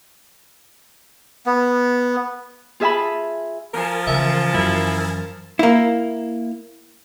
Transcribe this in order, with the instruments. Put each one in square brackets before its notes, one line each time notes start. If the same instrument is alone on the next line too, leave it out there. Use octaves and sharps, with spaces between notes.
[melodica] B3
[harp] F4 G#4 E5 G#5 A5 B5
[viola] F3 A5 [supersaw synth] A#4 G#5
[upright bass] C#3 E3 [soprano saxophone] E5
[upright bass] F#2 E3 [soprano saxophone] E4
[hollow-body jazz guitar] A#3 E4